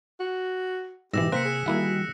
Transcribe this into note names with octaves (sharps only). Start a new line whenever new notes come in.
F#4
G#2 B2 E3 G4 E6 A#6 E7
C3 A#3 C4 C5 F#6 B6 C#7
G#4
D#3 G3 A#3 E4 F#4 F#5